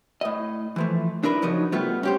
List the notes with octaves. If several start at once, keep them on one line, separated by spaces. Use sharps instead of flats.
A2 D#5
E3 F3 A3
D4 E4 A#4 B4
C#3 F3 F#3 D#4
G3 A3 B3 F4
C#4 G4 C5